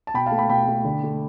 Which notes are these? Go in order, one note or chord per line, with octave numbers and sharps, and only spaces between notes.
A5
B2 G5 B5
F5 A5
A3
G5 B5
B2 G5 B5
A3
D3
A3